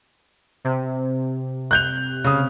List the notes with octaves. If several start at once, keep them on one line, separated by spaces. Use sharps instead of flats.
C3
F#6 G6 F7
C#3 D#6